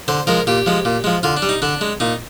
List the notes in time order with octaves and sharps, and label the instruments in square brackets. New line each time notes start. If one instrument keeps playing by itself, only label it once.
[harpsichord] D3 C5
F3 G#3 A#4
A#2 G4
F3 G#3
A#2
F3 G#3
D3 F4
D4
G3
D#4
D3 D4
G#3
A#2 D#4